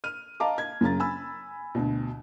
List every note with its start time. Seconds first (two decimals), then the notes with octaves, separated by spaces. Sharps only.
0.04 F6 D#7
0.40 D#5 F5 A5 A#5 D6
0.58 G#6
0.81 F#2 C#3 A#5 A6
1.00 G#5 B5 E6
1.75 D2 B2